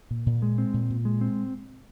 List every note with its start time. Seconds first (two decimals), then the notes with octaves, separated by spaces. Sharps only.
0.11 A#2
0.26 A#2
0.42 G#3
0.58 C4
0.74 A#2
0.90 A#2
1.05 G#3
1.21 C4